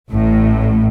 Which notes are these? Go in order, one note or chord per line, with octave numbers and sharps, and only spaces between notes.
A1 A2